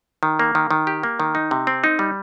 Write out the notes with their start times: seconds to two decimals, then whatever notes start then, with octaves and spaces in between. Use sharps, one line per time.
0.23 D#3
0.40 A#3
0.55 D#3
0.71 D#3
0.87 G4
1.03 A#3
1.20 D#3
1.35 D#4
1.51 C3
1.67 C4
1.84 D#4
1.99 G3